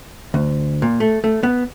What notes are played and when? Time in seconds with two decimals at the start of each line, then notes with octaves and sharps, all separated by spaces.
0.34 D2
0.82 A#2
1.00 A3
1.24 A3
1.43 B3